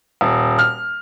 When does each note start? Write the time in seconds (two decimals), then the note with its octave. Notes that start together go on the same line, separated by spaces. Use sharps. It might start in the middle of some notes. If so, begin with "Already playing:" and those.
0.21 D#1
0.59 F6